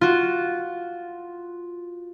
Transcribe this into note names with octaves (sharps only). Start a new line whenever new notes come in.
F4 F#4